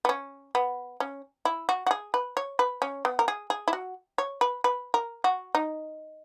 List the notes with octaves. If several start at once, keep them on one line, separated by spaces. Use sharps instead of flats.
B3
C#4
B3
C#4
E4
F#4
F#4
G#4
B4
C#5
B4
C#4
B3
A#4
G#4
G#4
E4
F#4
C#5
B4
B4
A#4
F#4
D#4